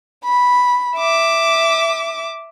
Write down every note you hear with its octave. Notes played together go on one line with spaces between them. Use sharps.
B5
E5 D6